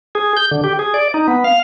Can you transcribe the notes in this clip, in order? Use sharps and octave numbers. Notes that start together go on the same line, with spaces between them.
G#4
G6
D3
G4
G#4
D5
D#4
B3
F5